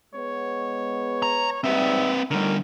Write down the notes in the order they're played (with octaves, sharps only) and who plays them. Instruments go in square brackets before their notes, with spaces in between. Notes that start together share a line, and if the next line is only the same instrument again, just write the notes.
[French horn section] G#3 B3 [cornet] C#5
[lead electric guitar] A#5
[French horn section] G#2 G3 [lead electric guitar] C4 B4 [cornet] E5
[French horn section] A2 D#3 [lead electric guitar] D3 G3 [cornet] A#4